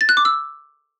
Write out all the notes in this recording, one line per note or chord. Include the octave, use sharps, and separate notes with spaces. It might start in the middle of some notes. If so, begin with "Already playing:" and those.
A6
F#6
D6
E6